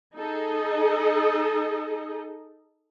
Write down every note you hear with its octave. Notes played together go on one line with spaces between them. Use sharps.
D#4 G#4 A4 D#5